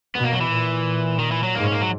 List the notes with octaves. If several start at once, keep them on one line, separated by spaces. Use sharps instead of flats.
B2 B3
A#3
F#3
E3
A#2
D#3
E3
F#3
G#2 A#3
C#4
A#3
F#3